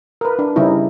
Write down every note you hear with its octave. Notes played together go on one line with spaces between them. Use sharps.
A#4 B4
D4
C#3 G3 C#4 D#4 E4